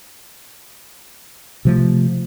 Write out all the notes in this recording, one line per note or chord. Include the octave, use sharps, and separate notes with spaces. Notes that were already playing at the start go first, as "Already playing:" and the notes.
C3 F3 A3